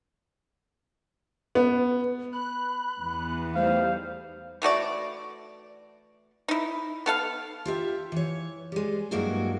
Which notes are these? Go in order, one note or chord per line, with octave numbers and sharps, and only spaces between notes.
B3
B5 F#6
E2 B3
G3 A3 D#4 C5 F5
E3 A3 F#4 D5
D#4 E4
B3 A4 F5
F4 G4 E5
E3 C#5
G3 G#3
G2 F#3 G#3 A#3 E4 F#4